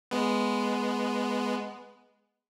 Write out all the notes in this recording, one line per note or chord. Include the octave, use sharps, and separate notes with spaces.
G#3 B3